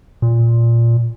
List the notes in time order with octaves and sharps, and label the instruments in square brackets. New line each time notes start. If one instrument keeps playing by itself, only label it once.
[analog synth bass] A#2